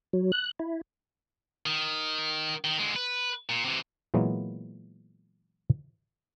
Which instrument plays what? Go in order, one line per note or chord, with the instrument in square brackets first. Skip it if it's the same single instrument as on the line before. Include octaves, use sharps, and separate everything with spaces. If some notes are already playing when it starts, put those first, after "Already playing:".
[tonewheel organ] F#3
F#6
E4
[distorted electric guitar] D#3
D#3
D3 G#3
B4
A#2
C3 E3
[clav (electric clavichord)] A#2 E3 F#3 G#3 A#3 B3